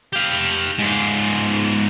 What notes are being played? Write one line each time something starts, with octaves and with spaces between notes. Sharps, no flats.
G4 F5
G#2 F4